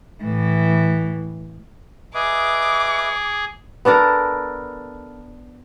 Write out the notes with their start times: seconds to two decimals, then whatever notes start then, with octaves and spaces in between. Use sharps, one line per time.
0.23 A2 E3
2.14 G#4 B4 D#5 E5 D6
3.85 B3 D4 A4 A#4